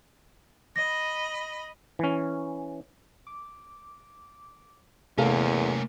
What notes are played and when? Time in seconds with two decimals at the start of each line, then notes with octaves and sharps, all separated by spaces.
0.76 D#5 B5 A#6
1.99 E3 C#4
3.27 D6
5.18 E2 C3 A3 A#3 C#4 A4 A#4 F5